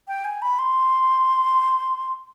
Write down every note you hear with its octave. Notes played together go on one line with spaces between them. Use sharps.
G5
G#5
B5
C6